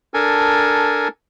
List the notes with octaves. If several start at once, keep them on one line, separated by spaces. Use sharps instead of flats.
D4 A4 A#4 G#5